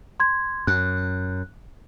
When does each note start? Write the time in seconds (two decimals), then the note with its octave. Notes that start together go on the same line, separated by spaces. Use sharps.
0.20 C6 G#6
0.67 F#2 F#6